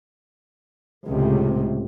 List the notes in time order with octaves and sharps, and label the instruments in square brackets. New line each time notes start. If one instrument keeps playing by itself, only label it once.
[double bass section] C#2 A2 C3